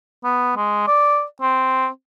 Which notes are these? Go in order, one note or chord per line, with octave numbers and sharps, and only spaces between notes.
B3
G#3
D5
C4